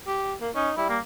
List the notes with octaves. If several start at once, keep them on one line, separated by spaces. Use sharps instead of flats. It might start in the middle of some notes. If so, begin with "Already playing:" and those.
G4
A#3
C#4 D#4
G3 E4
A#3